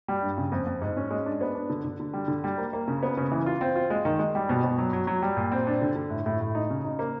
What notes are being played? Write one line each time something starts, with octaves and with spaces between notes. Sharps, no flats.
G3
G2
C#3
F2
F2
G#2
C#4
G#3
D4
B3
D4
D3
D3
D3
G3
D3
G3
A#3
A#3
C#3
B3
C#3
E3
F4
C4
F4
G#3
D#3
G#3
G3
B2
B2
F#3
F#3
F#3
G3
A#2
C4
D4
D3
D3
A2
A2
A2
D#4
C#3
D#4
A#3